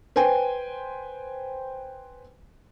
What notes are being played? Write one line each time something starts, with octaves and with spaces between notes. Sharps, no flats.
B4 C5 G5 G#5